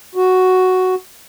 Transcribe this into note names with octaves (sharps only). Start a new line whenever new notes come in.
F#4